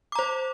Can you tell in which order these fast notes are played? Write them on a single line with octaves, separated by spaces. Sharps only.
D6 A#5 C5